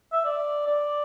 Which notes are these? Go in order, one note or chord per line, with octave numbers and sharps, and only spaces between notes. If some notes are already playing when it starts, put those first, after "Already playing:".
E5
D5
D5